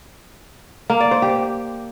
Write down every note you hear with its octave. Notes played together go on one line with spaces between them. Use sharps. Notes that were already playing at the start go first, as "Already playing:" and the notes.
A#3
D5
C5
G4